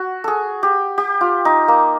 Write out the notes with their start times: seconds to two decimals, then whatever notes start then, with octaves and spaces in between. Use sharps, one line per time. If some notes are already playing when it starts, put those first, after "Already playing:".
Already playing: F#4
0.24 G#4 A4
0.63 G4
0.98 G4
1.21 F4
1.45 D#4
1.68 A#3